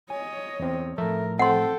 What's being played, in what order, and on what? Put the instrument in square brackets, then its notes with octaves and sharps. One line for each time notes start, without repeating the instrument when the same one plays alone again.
[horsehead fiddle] C#5 D#5 [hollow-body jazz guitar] G#5
[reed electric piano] E2 C4
[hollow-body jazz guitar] A2 F3 [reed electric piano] A4 E5 [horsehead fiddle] A#4
[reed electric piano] C4 [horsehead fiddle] A4 G5 [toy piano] F#5 C6